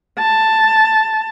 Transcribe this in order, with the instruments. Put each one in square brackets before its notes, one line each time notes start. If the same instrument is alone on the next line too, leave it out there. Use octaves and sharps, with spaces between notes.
[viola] A5